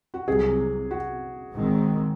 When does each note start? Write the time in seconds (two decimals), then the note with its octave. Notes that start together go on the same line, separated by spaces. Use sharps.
0.14 F#4
0.27 C2 C3 F#3 G#4
0.91 F#4
1.54 G#1 G#2 D#3 G#3 C4